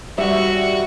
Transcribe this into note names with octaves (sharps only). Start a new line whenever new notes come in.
G3 F#4 E5 C#6